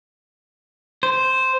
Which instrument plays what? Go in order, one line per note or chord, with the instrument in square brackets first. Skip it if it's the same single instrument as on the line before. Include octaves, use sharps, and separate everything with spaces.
[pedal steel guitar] C5